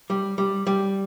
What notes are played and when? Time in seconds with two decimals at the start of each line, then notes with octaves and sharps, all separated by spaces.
0.10 G3
0.38 G3
0.67 G3